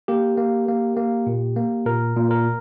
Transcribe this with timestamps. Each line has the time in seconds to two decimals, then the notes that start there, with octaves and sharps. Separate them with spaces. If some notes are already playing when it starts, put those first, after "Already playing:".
0.08 A#3 G4
0.38 A#3
0.68 A#3
0.97 A#3
1.26 A#2
1.56 A#3
1.86 A#2 A#4
2.16 A#2
2.31 A#4